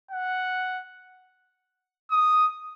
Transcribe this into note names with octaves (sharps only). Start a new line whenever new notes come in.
F#5
D#6